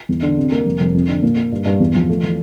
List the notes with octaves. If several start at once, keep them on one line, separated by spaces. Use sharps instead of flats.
E2
D3
C3
A#3
F1
F1
F2
D3
A#2
A#3
G2
G2
E2
F3
A3
E3